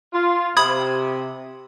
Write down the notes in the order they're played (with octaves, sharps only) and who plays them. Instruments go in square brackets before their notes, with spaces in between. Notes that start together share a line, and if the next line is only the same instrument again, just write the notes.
[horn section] F4
[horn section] C3 [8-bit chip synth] B5 D#6 G#6